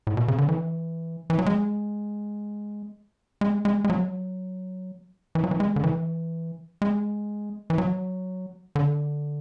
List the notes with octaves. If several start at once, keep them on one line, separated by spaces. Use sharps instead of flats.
A2
B2
C#3
D3
E3
E3
F#3
G#3
G#3
G#3
G#3
F#3
E3
F#3
E3
G#3
D3
E3
G#3
E3
F#3
D3